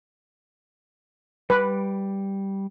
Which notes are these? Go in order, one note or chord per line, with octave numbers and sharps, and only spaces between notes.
G3 B4 D6